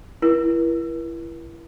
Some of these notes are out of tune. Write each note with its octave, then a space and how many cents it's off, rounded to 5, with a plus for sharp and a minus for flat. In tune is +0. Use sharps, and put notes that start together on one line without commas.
E4 +25 A#4 +45